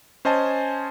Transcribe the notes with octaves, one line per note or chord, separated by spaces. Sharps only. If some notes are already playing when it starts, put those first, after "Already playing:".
C#4 C5 D#5 G#5 A5